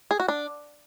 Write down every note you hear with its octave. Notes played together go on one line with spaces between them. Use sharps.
G#4
F#4
D4